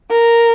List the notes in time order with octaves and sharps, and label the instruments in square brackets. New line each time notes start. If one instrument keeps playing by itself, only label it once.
[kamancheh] A#4